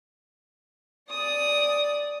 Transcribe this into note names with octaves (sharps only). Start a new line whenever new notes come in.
D5 D#6